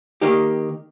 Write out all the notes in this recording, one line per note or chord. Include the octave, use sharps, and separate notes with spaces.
D#3 A#3 D#4 G4